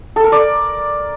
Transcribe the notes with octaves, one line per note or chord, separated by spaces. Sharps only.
A4
A#4
D5